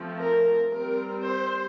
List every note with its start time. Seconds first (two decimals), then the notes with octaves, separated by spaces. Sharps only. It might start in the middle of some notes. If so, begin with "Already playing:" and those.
Already playing: F3 A3 C4
0.17 A#4
0.70 G3 C4 A#4
1.24 C5